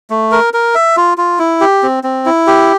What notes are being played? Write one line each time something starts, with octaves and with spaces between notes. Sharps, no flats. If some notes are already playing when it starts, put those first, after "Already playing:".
A3
A#4
A#4
E5
F4
F4
E4
G4
C4
C4
E4
G4